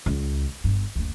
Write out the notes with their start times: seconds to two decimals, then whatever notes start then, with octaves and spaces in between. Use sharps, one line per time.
0.06 C#2
0.64 G1 G2
0.95 F#1 D2